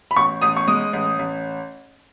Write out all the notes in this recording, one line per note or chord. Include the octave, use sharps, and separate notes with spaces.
B5
A1 C#6
A1 D#6
C#6
G#3 D#6
A1
A1